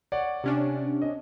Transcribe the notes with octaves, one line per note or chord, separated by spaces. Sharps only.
C#5 D5 F#5
C3 C#4 D4
D#5